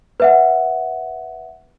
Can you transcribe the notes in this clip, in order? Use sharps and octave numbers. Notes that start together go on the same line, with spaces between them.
B4 E5 F#5